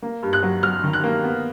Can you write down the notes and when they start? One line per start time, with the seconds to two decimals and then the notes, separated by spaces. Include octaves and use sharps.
0.02 A#3
0.23 G2
0.33 F#6
0.43 F#3
0.63 F#3 F6
0.84 D#3
0.93 F#6
1.04 A#3
1.24 B3